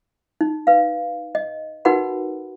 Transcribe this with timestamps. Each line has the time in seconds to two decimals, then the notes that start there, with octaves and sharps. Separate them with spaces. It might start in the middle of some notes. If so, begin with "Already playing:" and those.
0.41 D#4
0.67 B4 F5
1.35 D#5
1.85 D#4 F#4 A#4 B4 F#5 B5